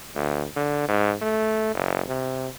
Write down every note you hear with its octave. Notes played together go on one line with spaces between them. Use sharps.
D2
D3
G#2
A3
F#1
C3